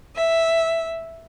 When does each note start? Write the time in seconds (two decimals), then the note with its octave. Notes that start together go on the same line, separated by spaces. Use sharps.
0.15 E5